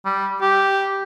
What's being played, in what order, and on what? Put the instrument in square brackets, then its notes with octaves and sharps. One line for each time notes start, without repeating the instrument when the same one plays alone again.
[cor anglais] G3
G4